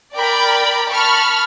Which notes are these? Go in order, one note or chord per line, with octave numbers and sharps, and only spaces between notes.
A#4 D5 G5 B5
A5 B5 C#6 F6